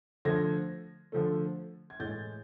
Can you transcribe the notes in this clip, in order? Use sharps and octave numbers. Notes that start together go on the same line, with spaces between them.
D3 F3 A3 G#6 A#6
D3 F3 A3
G#6
A2 E3 G#3 G6 A6